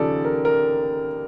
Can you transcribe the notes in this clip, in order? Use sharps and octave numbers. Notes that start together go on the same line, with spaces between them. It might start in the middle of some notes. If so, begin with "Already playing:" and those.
Already playing: D#2 C#3 F3 A4 D5
A#4
A#4